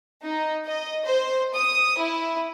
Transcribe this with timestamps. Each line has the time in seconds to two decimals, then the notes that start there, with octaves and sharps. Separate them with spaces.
0.25 D#4
0.67 D#5
1.06 C5
1.54 D#6
2.00 E4